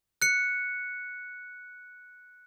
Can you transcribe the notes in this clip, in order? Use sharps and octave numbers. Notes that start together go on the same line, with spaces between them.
F#6 C#7